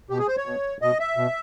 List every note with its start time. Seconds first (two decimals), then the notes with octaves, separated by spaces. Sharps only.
0.10 B2 G4
0.19 G#4
0.28 C5
0.37 C#5
0.46 B2
0.82 B2 D#5
1.00 E5
1.17 B2